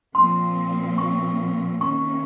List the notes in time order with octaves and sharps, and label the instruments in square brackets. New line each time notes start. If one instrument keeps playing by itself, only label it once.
[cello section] A#2 F3 C4 [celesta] C6
[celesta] C#6
[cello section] C3 D#3 A#3 C#4 [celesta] C#6